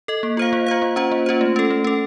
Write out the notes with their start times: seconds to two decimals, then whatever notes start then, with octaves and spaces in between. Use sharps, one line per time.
0.08 A4 D#5
0.23 A#3
0.37 F4 C5 F5
0.53 A#3
0.66 F4 C5 F5
0.82 A#3
0.96 C#4 F4 C5
1.12 A#3
1.26 C#4 F4 C5
1.41 A3
1.56 C#4 A4
1.70 A3
1.84 C#4 A4